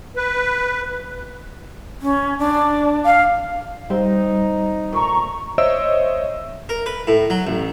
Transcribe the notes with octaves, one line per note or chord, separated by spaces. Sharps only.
B4
C#4
D4
F5
G3 C4 D#4
A#2 A3 A#5 C#6
C5 C#5 D#5 E5 E6 D7
A#4
B4
A2
F#3
A1